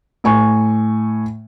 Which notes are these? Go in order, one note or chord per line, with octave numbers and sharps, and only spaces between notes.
A2 G#5 C#6